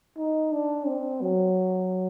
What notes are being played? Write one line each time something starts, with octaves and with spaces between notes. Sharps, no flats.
D#4
D4
C4
F#3